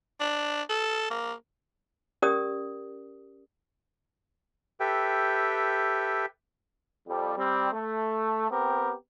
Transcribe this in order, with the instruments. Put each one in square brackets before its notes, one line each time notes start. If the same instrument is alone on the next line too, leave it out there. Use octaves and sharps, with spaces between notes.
[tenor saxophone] D4
A4
A#3
[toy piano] C#4 G4 A#4 D5 D#6
[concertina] G4 A4 B4 E5 G5
[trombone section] F2 G3
G3 C4
A3
B3 C4 G4 A#4